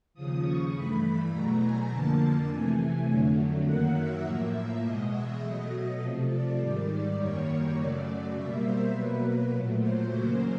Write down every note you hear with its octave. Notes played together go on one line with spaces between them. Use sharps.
D#2 C#3 F3 D#6
C#6
G2 E3 A3 B5
E2 B2 F#3 A3 A#5
G#5
F2 D3 F3 A#3 A5
C3 E3 A3 G#5
F2 D3 F#3 A3
F#2 D#3 F#3 A#3 F#5
E5
A2 F3 A#3
E5
E2 B2 G#3 D#5
E5
B2 F#3 A3 D#5
C3 F3 A3
D5
G#2 D#3 G3
D5
F#2 D#3 G3 A#3 C#5
F#2 C#3 F#3 A3 D5
B2 G3 A#3 E5
C5
B2 F#3 A#3 B4
A#2 F#3 A3
C5
E2 C#3 F#3 A#3